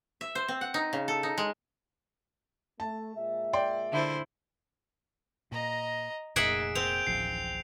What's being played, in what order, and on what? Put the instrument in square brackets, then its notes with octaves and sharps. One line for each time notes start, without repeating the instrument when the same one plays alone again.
[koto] E5
C5
C4
F#5
D#4
C#3
A4
D#4
G#3
[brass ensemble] A3 [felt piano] A5
[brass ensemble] A#2 G#3 E5
[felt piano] D5 G5 C6
[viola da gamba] D3 E4 C5
[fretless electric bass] A#2 [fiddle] D#5 A#5
[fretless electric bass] F1 A#2 [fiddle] D#4 [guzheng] G#4 E5 F#5 [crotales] D7
[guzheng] C4 [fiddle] G5 [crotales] G6 F7
[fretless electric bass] D1 A1 F3 [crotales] C7